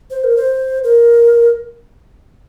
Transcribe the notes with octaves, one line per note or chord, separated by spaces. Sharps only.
C5
A#4
C5
A#4